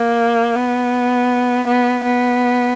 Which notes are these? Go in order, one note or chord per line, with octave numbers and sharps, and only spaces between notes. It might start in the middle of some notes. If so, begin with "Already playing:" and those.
Already playing: A#3
B3
B3
B3